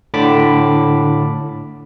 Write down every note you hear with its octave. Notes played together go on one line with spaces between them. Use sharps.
A2 D3 A5 B5 D6